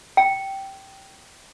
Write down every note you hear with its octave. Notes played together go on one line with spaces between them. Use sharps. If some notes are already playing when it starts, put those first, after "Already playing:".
G5